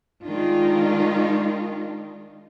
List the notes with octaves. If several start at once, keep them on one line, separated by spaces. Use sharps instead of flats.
D#3 G#3 D4 D#4 F4